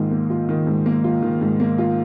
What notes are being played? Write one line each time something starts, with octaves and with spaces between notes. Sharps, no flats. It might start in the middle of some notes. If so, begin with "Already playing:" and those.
Already playing: G#2 D#3 A#3 F4
A#3
F4
D#3
G#2
A#3
F4
D#3
G#2
A#3
F4